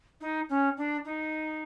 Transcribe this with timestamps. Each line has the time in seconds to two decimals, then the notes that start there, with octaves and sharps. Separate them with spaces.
0.21 D#4
0.49 C#4
0.77 D4
1.05 D#4